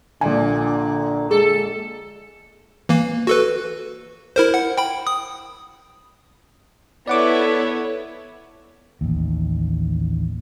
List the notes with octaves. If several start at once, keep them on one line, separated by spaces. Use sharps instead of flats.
A#1 A#2 D3 G#5
G#3 G#4 A4
E3 A#3
F#4 A4 B4
E4 A#4 C5
F#5
G5 B5
D#6
B3 E4 A4 C#5 D5 F#5 D6
A1 D#2